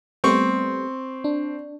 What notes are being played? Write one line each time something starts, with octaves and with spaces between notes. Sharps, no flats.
G3 A3 B3 C4 C#6
D4